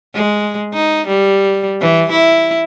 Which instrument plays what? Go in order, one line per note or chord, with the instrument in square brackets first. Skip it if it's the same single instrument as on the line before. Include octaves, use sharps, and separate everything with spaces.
[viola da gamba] G#3
D#4
G3
E3
E4